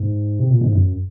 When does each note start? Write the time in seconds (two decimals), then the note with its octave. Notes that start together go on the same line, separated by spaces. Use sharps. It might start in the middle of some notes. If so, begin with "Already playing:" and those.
Already playing: G#2
0.39 C3
0.50 A#2
0.61 G#2
0.73 F#2